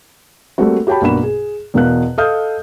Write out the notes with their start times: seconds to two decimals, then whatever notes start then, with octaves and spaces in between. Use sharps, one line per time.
0.58 G3 A3 A#3 C4 F#4
0.87 F#4 G4 C#5 G5 A5 B5
1.01 B1 G2 A#3 F#4 B5 E7
1.23 G#4
1.74 E2 B2 A#4 F5 F#6
2.18 A4 D#5 F5 D#6 F6 G6